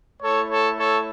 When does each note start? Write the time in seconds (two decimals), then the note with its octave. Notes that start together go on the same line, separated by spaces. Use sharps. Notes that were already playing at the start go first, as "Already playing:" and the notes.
0.22 A3 E4 A4 C#5
0.50 A4 C#5
0.79 A4 C#5